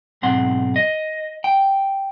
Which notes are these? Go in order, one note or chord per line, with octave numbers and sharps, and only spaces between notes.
B1 G#2 C4 F#5 C6
D#5
G5